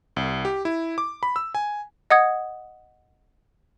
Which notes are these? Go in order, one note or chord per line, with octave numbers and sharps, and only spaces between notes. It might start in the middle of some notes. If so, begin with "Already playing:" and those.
C2
G4
E4
D6
B5
E6
G#5
D#5 F#5 D#6 G#6